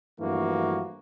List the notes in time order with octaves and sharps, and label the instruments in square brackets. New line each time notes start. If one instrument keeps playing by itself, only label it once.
[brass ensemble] G2 E3 F3 A3 A#3 F#4